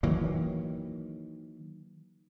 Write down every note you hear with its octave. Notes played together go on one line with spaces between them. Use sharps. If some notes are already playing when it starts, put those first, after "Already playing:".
D#3 E3 F#3 A#3